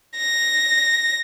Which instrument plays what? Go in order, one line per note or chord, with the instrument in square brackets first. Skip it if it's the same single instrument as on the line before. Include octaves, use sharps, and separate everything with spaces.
[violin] A#6